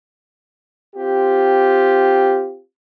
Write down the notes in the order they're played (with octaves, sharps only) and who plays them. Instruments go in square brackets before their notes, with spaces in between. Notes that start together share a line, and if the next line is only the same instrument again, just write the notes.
[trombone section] C4 F4 G4